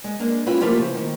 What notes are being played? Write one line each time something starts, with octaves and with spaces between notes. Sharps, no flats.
G#3
G#3 A#3 D4
C4 C#4 E4 F4 B4
F3 G3 A3 A#3 F4 G4
C#3 E4 C5
D#3